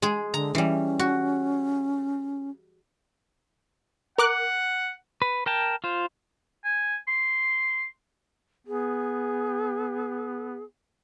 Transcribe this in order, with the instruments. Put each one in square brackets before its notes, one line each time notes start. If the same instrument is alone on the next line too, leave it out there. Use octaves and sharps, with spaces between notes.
[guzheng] G#3 G#4
[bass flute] D3 [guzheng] A#5
[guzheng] E3 G3 [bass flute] C#4
[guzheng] F#4
[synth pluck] A#4 D6 F#6 [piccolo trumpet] F#5
[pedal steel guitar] B4
A#4 G5 A5
F4 C5
[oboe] G#5
C6
[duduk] B3 [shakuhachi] G#4